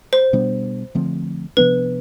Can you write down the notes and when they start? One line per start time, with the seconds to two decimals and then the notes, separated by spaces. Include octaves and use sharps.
0.13 C5
0.33 B2 G3 B3 D4
0.95 D3 F3 A3 C4
1.57 C3 F3 B3 D4 B4